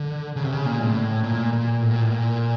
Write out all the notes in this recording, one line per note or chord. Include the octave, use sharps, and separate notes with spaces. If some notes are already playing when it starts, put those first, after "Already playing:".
Already playing: D3
C#3
C3
C#3
A#2
A2
A#2
A#2
A2
A#2
A2
A#2